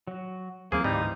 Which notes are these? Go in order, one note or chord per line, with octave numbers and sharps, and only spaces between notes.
F#3 F#4
D#2 E3 F#3 A#3 C4 G#4 C5 C6
D2 G#2 G3 D#4